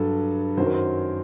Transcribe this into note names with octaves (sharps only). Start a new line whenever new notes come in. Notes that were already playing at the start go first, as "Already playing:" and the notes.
Already playing: G2 F#3 A4
F#2 D#3 F#3 C5
A#4
C5